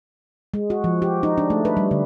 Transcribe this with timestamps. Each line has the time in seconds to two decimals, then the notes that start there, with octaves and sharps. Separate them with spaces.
0.54 G#3
0.70 F#4
0.84 F3
1.02 G4
1.23 D#4
1.38 D4
1.50 A3
1.65 B4
1.77 G3
1.91 D3